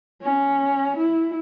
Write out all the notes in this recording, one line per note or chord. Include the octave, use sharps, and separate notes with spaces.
C#4
E4